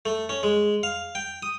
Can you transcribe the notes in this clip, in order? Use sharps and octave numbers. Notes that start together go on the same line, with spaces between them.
A3
C#4
G#3
F5
G5
D#6